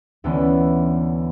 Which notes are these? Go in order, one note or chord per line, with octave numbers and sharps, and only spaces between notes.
D2 D3 E3 B3 C#4